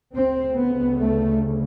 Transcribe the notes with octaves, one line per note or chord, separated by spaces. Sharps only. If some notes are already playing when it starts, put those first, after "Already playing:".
D2 C#3 C4
B3
A3